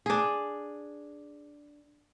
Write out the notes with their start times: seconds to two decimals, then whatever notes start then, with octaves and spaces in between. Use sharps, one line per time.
0.06 D4 G#4